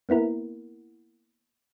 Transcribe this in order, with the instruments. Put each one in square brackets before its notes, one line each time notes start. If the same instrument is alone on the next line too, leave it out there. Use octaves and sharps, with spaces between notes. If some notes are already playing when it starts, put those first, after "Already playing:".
[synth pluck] A#3 B3 E4 A#4